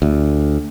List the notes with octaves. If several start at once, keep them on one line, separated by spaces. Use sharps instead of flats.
D2